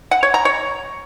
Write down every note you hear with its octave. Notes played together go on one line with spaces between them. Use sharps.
F#5
C#5
A#5
C#5